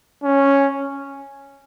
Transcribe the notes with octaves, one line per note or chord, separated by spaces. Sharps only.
C#4